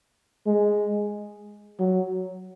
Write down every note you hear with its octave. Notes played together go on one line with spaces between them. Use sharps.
G#3
F#3